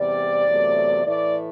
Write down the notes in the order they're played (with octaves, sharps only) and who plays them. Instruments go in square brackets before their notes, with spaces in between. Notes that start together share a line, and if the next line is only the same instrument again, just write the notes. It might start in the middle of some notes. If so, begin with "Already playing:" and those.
Already playing: [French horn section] E2 C3 G3 D5
E2 C3 F#3 A3
A2 E3 A3 D5